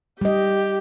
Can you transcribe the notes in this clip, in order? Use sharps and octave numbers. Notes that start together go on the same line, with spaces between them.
G3 G4 D#5